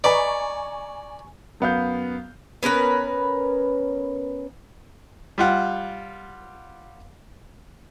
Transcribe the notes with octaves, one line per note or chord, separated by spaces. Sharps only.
B4 D5 D#5 G#5 A#5 C#6
F#2 B3 F5 G6
B3 C#4 A#4 B4
G3 F4 F#5